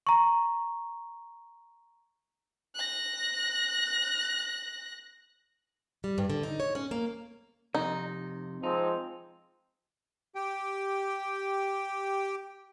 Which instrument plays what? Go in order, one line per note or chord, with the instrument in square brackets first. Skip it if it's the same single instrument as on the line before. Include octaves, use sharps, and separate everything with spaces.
[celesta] A#5 C#6
[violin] F#6 A#6
[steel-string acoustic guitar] G3
G2
D3
D#4
C#5
C#4
A#3
[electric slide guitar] F2 C3 [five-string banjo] D#4
[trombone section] F3 G#3 C4 [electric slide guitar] D#4
[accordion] G4 G5